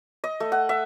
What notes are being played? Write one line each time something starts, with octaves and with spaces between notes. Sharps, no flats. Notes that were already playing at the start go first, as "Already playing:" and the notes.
D#5
A3
F#5
E5